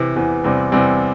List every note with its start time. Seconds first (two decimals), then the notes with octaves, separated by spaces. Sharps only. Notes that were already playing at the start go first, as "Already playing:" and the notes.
Already playing: C3 E3
0.16 E2 C3 E3
0.44 E2 C3 G3 C4
0.72 E2 C3 G3 C4